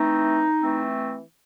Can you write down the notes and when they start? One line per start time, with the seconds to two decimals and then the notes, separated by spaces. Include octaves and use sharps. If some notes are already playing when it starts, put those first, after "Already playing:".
Already playing: E3 A3 C4 D#4
0.60 E3 A3 C4